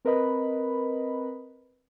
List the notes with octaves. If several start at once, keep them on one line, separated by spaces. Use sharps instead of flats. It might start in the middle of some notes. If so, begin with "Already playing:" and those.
C4 A#4 B4 D#5 B5